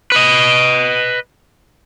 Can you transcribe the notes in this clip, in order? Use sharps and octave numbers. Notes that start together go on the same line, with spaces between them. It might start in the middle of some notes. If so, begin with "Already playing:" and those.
B4 D#5